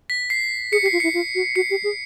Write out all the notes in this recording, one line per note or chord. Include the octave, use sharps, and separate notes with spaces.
B6
C7
G#4 C#7
G4
C7
F4
E4 C#7
F4
F#4
F#4 C#7
G4
G#4